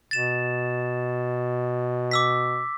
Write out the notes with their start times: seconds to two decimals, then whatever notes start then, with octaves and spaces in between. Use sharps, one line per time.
0.11 B2 A6 E7
2.11 D6 E6 B6